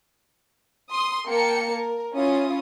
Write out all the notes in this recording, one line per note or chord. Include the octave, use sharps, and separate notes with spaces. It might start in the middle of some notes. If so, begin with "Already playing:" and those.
C6 D#6
A#3 G5 A5 C#7
A#4
C#4 E4 F4 D#6